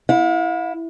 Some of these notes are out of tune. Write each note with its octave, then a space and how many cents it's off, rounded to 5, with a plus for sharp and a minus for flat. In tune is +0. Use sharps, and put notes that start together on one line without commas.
E4 +0 F5 +45